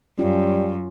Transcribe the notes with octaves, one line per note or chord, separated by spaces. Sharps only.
F#2 G3 C#4 F4